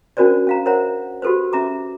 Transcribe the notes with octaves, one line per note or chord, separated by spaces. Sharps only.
C#4 D4 F#4 A#4 C5 D5
C#4 F5 A#5
A#4 C5 C#5 E5 F#5 A#5
F#4 G4 A4 B4 C5
C#4 E5 A#5 D6